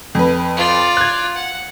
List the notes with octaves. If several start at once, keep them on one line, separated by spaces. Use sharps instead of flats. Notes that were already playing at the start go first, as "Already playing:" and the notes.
F2 B4
F4 D5
F#6 G#6
F#5